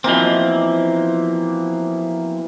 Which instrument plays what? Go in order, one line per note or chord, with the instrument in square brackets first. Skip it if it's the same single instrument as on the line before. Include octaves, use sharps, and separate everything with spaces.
[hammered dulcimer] B2 E3 A#3 [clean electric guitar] F3 C4